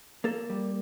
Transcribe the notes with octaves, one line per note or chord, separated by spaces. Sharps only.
A#3 A4
G3